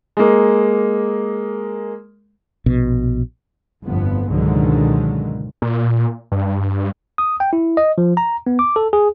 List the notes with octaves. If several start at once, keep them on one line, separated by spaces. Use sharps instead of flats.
G#3 A#3
A#1 B2
G1 F2 A2 F3 B3
C#2 G#2 B2 D3 D#3 F#3
A#2
G2
D#6
G5
E4
D#5
F3
A#5
B3
D6
A4
G#4